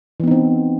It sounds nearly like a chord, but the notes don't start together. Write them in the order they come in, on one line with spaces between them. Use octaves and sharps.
E3 B3 D#4 C4